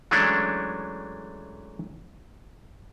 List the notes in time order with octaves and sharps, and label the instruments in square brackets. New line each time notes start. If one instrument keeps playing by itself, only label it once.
[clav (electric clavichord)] E3 F#3 G#3 A3 C#4 D4